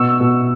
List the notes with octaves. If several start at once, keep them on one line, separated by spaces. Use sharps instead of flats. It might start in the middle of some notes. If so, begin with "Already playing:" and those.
Already playing: B2 C#6 E6
B2